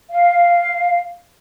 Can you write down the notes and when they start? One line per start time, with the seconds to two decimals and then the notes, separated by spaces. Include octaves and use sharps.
0.10 F5